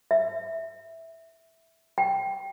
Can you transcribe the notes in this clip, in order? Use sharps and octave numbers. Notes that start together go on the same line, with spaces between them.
E5
G5